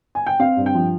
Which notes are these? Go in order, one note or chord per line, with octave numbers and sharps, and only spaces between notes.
G#5
G5
C4 F5
G2
G5
F3